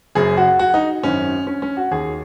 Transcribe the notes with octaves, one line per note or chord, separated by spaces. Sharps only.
F#1 F#2 C#3 G#4
F#4
F#4
D#4
G#1 F#2 D#3 C#4
C#4
C#4
F#4
D#2 D#3 G#4